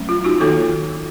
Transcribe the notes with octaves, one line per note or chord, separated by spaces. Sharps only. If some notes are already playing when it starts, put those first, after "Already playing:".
Already playing: F#3 A3 C#4
F4
D#4 F#4
D#3 A#3 D#4 F4 A4